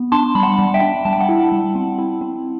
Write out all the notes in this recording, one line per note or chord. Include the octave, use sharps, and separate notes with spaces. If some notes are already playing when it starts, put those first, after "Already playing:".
Already playing: B3
D4 A5 C6
G3 B5
F#5 A5
G3
E5 G5
D4
G3 A5
G5
F#5 A5
E4
G3
C4
E4
C4